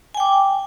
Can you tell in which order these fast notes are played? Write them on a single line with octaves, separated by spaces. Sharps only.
G#5 G5 D6